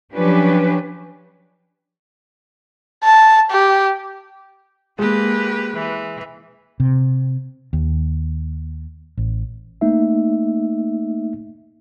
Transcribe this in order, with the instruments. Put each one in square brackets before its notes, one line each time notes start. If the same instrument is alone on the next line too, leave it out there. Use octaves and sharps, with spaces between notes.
[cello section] F3 F#3 C#4 D4 G4 B4
[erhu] A5
G4
[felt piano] G#3 [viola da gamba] A#3 [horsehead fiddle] G4 B4
[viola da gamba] E3
[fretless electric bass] C3
D#2
A1
[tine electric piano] A3 A#3 D#4 E5